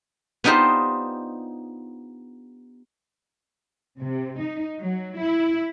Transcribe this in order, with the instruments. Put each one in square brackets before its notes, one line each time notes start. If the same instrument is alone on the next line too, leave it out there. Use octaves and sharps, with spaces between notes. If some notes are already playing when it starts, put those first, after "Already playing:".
[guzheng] B3 D4 D#4 F4 G4 C5
[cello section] C3
D#4
F#3
E4